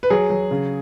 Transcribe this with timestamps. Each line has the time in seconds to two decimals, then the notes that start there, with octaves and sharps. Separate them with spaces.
0.03 B4
0.10 F#3 G#4
0.30 F#3
0.51 C#3